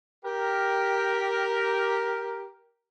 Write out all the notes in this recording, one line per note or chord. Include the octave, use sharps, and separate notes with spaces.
G4 A#4